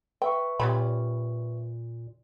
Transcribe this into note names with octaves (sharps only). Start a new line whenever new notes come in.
B4 E5 G5 C#6
A#2 G3 C#4 B5